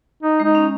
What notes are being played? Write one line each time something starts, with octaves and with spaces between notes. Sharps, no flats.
D#4
G#3
D#4
C#4